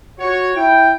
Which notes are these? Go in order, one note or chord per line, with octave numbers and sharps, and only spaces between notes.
F#4 C#5
E4 G5